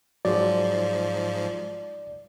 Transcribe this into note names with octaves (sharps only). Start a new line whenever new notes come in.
G#2 F3 F#3 G#3 D5